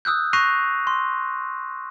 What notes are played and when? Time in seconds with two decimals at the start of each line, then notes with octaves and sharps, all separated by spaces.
0.05 D#6 E6 F#6 G6
0.33 C#6 F#6 A#6 C7 D#7 F7
0.87 C6